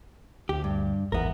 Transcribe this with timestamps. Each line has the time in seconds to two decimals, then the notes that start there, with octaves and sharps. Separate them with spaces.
0.49 D2 G4
0.64 G2
1.12 G#1 E2 B3 A#4